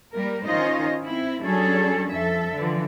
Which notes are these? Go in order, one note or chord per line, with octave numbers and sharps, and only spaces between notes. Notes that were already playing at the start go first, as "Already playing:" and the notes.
G3 A#3 A#4
D#3 C#4 D#4 F4 C5 D#5
C4 E4
F#3 G3 C#4 D4 G#4 A4
F2 A4 E5
D3 E3 F3